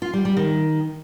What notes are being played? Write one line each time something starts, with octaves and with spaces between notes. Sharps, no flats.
F4
G3
G3
D#3